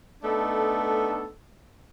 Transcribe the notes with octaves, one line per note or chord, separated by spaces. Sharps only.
A3 B3 D4 D#4 A4